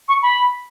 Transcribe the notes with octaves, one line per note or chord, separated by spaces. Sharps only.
C#6
B5